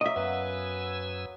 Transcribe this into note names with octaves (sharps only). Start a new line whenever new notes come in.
F#3 A#3 D#5 E5
F#2 B3 B4 G#5 E6